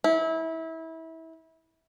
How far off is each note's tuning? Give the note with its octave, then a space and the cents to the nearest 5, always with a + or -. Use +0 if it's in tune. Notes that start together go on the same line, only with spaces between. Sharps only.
E4 -25